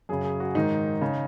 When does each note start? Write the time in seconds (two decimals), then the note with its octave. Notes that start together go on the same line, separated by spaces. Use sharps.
0.09 F#2 C#3 G#4
0.25 G#4
0.40 F#4
0.55 G#2 D#3 D#4
1.01 C#3